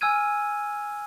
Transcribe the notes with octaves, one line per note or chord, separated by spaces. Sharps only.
G#5 E6 F6 G#6 D#7